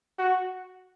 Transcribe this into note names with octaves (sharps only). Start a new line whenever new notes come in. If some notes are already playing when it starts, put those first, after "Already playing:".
F#4